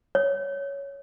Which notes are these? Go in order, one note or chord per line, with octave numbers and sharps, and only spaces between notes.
C#5